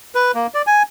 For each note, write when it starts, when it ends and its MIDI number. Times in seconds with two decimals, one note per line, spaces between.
0.15 0.32 71
0.35 0.47 58
0.54 0.62 74
0.67 0.83 80